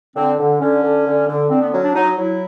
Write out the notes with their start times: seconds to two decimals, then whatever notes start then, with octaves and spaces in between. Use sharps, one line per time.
0.16 D3 C4
0.38 D3
0.60 D3 C#4
0.82 D3
1.06 D3
1.28 D3
1.50 D3 C4
1.61 B3
1.72 F#3 C#4
1.84 D4
1.94 F#3 D#4
2.17 F#3 E4